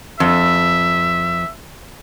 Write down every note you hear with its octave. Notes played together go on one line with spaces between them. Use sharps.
F2 E5